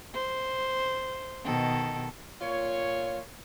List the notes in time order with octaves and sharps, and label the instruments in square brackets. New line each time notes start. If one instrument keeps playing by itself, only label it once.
[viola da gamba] C5
B2 D#3 A4
[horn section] A#2 F4 C#5